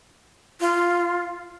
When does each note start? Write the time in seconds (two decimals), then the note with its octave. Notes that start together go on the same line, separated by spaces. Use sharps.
0.60 F4